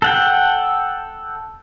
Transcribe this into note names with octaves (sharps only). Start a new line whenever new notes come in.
A4 F#5 G5